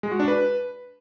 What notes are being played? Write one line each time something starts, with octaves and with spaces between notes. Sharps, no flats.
G#3
F#4
D4
B4